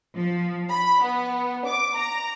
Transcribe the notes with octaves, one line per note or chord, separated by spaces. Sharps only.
F3
B5
B3
D6
A#5